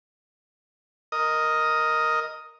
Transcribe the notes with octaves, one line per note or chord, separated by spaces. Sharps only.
A#4 D#5 D#6